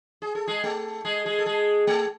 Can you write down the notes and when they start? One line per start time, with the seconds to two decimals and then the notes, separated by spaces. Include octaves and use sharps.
0.22 G#4
0.35 A4
0.47 G#3 G#4
0.63 A3 A4
1.05 G#3 G#4
1.26 G#3 G#4
1.38 A4
1.46 G#3 G#4
1.87 A3 A4